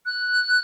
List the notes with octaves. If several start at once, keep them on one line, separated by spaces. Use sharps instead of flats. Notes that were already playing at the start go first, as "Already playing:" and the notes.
F#6